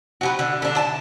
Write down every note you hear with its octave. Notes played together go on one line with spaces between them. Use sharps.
F#4 G4 B4
D3
D3 D4
A5